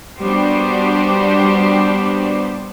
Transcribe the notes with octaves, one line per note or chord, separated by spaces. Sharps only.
G3 B3 D4 F#4 G4 C5